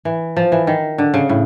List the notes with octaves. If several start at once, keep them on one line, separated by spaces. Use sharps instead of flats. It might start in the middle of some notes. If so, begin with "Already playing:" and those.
E3
F3
E3
D#3
D3
C#3
A2